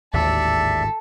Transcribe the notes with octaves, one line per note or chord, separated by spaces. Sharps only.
G#1 D#2 A2 D3 A4 D5 E5